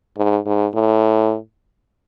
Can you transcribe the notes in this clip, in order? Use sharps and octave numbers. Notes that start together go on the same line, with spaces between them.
G#2
G#2
A2